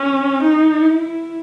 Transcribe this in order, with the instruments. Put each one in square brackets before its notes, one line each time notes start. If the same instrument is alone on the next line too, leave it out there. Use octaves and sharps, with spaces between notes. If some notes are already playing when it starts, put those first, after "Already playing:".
Already playing: [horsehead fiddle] C#4
D#4
E4